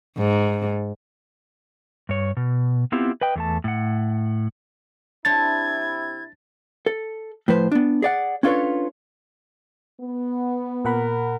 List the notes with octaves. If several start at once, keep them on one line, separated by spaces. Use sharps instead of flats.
G#2
G2 C#5
B2
B3 C4 E4 F4 G4
B4 D#5 G5
E2 A3 A5
A2 F#5
C3 D4 E4 C5 C#5 G#6 A6
A4
A2 F3 B4 C5
B3 D4
G#4 D5 F#5
C#4 D4 F4 A4 B4 C#5
B3
A#2 A#4 F#5 B5